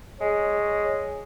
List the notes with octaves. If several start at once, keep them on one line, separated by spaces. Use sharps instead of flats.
G#3 C#5